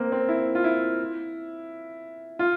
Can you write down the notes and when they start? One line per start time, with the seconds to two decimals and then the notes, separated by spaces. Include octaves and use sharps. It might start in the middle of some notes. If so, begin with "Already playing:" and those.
Already playing: A#3 C4
0.12 C4
0.29 E4
0.55 F4
0.64 E4
2.39 F4